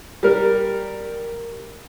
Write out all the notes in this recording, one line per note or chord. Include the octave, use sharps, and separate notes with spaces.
G3 A#4